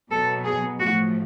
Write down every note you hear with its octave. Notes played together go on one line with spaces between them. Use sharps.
B2 F#3 B3 A4
G#4
A2 F3 A3 F#4